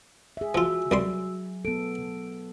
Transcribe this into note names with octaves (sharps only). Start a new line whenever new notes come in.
G#4 E5
F3 F4 F#4 E6
C2 F#3 G3 C6
B3 A4 D7